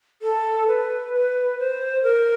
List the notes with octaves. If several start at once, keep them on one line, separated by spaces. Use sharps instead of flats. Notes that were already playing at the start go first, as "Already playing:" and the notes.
A4
B4
B4
C5
A#4